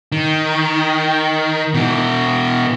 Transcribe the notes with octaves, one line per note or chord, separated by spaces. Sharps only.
D#3
B2 E3